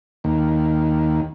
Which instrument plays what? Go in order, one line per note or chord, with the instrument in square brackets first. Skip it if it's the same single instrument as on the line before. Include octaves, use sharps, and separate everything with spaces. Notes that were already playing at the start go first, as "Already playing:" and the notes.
[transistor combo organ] D#2